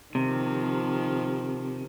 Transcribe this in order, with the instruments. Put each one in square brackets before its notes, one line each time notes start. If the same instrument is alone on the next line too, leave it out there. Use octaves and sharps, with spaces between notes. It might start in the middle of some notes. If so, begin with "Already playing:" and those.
[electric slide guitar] C3 [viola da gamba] D#3 F3